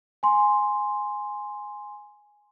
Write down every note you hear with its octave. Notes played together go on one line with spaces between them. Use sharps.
G#5 C6